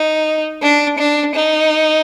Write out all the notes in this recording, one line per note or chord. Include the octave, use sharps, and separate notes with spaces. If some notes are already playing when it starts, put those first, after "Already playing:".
Already playing: D#4
D4
D4
D#4